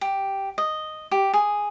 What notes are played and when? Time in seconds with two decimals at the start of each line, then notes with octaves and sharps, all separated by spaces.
0.01 G4
0.58 D#5
1.11 G4
1.33 G#4